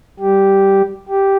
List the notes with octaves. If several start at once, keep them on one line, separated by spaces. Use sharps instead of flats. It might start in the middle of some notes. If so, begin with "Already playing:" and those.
G3 G4
G4